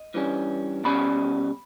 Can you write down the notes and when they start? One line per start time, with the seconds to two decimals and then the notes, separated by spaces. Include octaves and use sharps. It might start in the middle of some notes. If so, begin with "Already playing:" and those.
Already playing: D#5
0.14 G2 E3 G3 C#4
0.84 B2 G3 C#4 B5